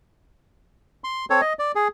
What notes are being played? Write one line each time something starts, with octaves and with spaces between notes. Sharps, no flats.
C6
C4 A4 C#5
D#5
D5
G#4